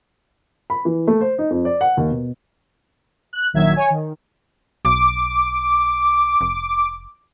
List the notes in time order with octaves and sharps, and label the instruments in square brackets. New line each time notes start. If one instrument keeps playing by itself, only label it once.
[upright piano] B5
E3
A3
C5
D#4
F2
D5
F#5
D#2
B2
[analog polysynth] F#6
A#1 D#3 F#3 E5 G#6
C#5 G#5
D#3
[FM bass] B1 [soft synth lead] D6
[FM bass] F1